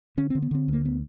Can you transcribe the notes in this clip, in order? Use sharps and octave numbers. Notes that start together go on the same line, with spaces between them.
D3 C#4
D3 C4
B3
D3 C4
D2 A#3
B3